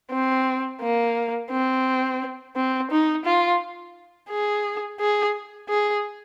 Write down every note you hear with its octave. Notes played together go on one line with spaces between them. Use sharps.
C4
A#3
C4
C4
D#4
F4
G#4
G#4
G#4